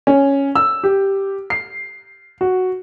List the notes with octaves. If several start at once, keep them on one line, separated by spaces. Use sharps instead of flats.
C#4
E6
G4
C7
F#4